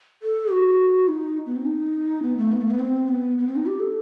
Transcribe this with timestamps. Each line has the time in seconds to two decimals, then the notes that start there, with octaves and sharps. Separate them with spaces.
0.22 A4
0.51 F#4
1.08 D#4
1.46 B3
1.56 C4
1.66 D#4
2.22 B3
2.37 A3
2.52 B3
2.61 A3
2.70 B3
2.79 C4
3.08 B3
3.38 B3
3.47 C4
3.56 D#4
3.66 G4
3.80 A4